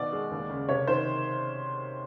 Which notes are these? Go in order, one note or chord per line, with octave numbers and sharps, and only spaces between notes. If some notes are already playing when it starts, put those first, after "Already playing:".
Already playing: B2 D#3 D5
G#3
D#2
C#3
C3 C#5
D#3 C5